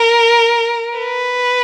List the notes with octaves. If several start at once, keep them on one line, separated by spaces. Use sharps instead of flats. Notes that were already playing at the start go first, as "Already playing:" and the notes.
Already playing: A#4
B4